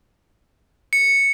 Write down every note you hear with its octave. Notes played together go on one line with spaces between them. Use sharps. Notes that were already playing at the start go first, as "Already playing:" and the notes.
C#7